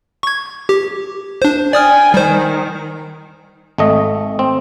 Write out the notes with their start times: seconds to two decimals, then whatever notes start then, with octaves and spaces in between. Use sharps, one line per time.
0.23 C#6 G#6
0.69 G4
1.42 D4 C5
1.73 D5 G5 G#5 D#6 F6
2.14 D#3 G3 C5
3.78 G#1 A3 D#5
4.39 C4